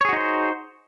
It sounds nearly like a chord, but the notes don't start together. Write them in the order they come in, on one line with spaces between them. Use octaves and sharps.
C#5 G#4 F#4 D#4 C5